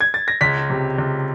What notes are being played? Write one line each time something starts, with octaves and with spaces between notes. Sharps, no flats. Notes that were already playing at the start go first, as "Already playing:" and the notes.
G#6
A6
A#6
C#2 B6
C3
C#2